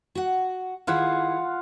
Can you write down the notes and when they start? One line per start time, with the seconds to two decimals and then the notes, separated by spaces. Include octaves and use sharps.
0.15 F#4 F#5
0.87 D#3 E4 F4 G#4 F5 F#5